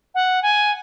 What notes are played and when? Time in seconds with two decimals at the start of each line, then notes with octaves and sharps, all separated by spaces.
0.14 F#5
0.42 G#5